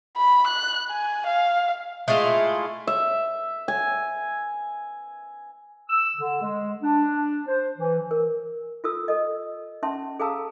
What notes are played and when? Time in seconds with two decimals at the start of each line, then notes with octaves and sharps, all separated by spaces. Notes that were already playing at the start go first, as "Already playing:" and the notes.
0.17 B5
0.47 F#6
0.89 G#5
1.27 F5
2.08 G#3 A3 E4 F4
2.87 E5
3.68 G#5
5.88 E6
6.16 D3
6.41 G#3
6.82 D4
7.47 C5
7.78 E3
8.11 A#4
8.84 F4 A4 E6
9.08 A4 D#5
9.83 C#4 E5 A5 C6
10.20 G#4 A4 F5 A5 A#5 E6